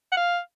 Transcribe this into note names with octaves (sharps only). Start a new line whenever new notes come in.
F#5
F5